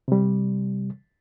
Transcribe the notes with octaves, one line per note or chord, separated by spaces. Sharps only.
C3 G3